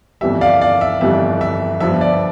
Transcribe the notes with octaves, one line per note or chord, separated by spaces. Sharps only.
G1 F2 E3 G3 E5
D5 F5
D5 F5
E5
G1 F2 E3 G3 E5
E5
G1 G2 F3 E5
D5